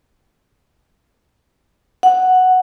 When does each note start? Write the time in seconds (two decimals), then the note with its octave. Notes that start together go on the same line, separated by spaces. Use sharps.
2.03 F#5